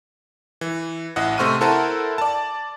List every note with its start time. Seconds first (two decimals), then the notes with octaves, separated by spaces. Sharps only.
0.61 E3
1.16 A1 E4 D#5 F#5
1.38 C3 A3 C5 C#6 F6 D#7
1.61 E4 A4 A#4 C5 F#5 A5
2.18 D5 A5